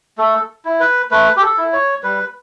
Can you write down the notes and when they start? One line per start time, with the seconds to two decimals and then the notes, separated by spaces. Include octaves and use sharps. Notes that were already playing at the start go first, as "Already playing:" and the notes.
0.18 A3 A4
0.65 E4
0.80 B4
1.11 A3 B4
1.37 G4
1.42 A4
1.58 E4
1.73 C#5
2.03 G3 B4